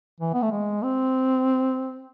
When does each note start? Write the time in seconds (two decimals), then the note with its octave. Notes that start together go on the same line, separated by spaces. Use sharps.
0.20 E3
0.34 B3
0.42 A3
0.51 G#3
0.83 C4